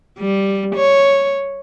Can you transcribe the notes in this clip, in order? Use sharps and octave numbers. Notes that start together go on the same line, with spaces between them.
G3
C#5